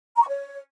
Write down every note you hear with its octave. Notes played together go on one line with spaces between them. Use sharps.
A#5
C#6
C#5